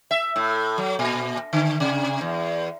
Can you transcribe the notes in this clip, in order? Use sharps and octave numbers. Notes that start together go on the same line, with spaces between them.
E5
A2
F#3
A#2
D3
C3
E2